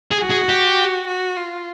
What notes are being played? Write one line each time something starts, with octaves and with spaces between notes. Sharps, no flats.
G#4
F#4
G#4
G4
F#4
F4